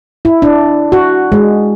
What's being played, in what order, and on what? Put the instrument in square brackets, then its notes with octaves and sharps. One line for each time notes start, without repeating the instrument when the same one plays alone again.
[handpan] E4
D4
F#4
G#3